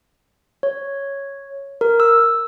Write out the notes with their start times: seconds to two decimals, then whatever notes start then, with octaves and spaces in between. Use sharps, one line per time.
0.63 C#5
1.81 A#4
2.00 E6